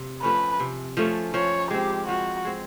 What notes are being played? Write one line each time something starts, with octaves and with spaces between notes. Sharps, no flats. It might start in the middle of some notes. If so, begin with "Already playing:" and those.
Already playing: C3
F3 A3 C#4 B4
C3
F3 A3 C#4
F3 C#5
G#3 C4 G4
F3 F#4
G#3 C4